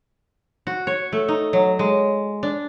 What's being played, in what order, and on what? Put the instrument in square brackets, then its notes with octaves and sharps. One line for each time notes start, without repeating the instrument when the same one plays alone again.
[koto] F#4
C#5
A3
D#4
F#3
G#3
D4